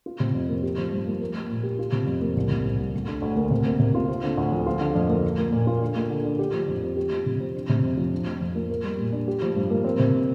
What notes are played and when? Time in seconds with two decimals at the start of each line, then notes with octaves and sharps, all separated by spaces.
0.06 F4
0.20 C3
0.35 F2
0.49 A#3
0.63 G4
0.78 F3
0.92 G2
1.07 A#3
1.21 A#4
1.35 A#3
1.50 A#2
1.63 G4
1.79 F4
1.92 C3
2.07 F2
2.21 A#3
2.37 C2
2.50 C3
2.65 C2
2.79 G3
2.94 D2
3.08 D3
3.22 D2
3.37 A#3
3.51 C3
3.66 A#3
3.79 C3
3.95 F4
4.09 C4
4.23 D3
4.37 D2
4.52 F3
4.66 F4
4.81 D3
4.95 F2
5.09 A#3
5.24 A#4
5.38 A#3
5.52 A#2
5.67 F4
5.81 D3
5.96 A#3
6.10 D3
6.25 D4
6.39 G4
6.54 F3
6.68 F2
6.83 C4
6.97 G4
7.11 F3
7.26 C3
7.40 C4
7.55 D4
7.69 C3
7.83 F2
7.97 F3
8.12 D4
8.27 F3
8.41 F2
8.55 A#3
8.70 A#4
8.84 G3
8.98 A#2
9.12 D4
9.28 G4
9.42 F3
9.56 G2
9.70 A#3
9.84 C4
9.99 C3